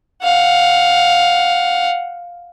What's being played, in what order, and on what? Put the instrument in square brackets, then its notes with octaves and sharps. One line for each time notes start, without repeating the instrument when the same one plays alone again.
[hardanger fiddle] F5 F#5